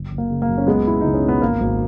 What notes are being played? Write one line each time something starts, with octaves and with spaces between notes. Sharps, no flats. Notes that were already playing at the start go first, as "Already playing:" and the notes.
Already playing: F#1
F#1
A#3
C#3
A#3
F#2
C#4
C#2 G#3 B3
B2 E4
C#2 D#4
C#4
B2
B3
G#1 A#3
G#1